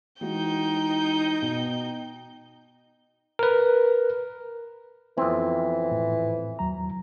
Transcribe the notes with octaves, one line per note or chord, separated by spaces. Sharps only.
E3 G#3 D#4 F#4 G5 G6
B2
A#4 B4
F2 E3 B3 C4
A2
D#2 F#3 A#5